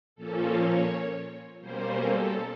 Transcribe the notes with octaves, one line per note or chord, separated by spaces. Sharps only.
A#2 F3 A#3 C#4 A4
C#5
B2 G3 A#3 C#4 C5
A4